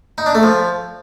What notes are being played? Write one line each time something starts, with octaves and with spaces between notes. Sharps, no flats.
D#4
D4
A3
F3